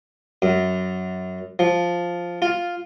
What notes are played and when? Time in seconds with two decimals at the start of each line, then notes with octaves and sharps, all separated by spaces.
0.42 F#2
1.59 F3
2.42 F4